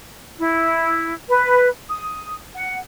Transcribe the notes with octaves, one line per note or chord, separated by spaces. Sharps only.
E4
B4
D#6
F#5